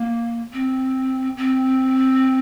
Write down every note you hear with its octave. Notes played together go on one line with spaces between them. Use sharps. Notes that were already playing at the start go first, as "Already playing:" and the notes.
Already playing: A#3
C4
C4